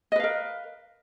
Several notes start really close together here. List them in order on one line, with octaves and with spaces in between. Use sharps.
D#5 B4 F5 A#4